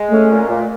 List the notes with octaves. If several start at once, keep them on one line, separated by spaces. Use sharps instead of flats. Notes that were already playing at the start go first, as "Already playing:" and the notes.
Already playing: G#3
A3 C#4
A#2
A#2